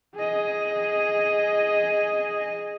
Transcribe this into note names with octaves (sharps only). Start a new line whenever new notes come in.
G#4 D#5